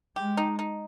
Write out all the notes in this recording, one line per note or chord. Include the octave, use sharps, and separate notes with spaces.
G#3 G4
D#4
D#4